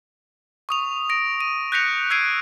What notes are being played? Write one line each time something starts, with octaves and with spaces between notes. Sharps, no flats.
C#6 D#6 F7
A#6 D7
D#7
F#6 G6 A#6 B6 C#7 F7
E6 F#6 G#6 C7 D7 D#7